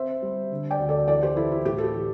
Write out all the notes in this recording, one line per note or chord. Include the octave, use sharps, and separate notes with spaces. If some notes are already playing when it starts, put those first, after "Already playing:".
Already playing: C4 C5 E5
G3
D3
D5 G5
D2
A4 D5
E3 A4 D5
G4 C5
E3 E4 A4
E4
A2 G4
A4
G4
E3